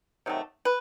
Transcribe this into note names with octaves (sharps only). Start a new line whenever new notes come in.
C3 D#3 F#3 A3
B4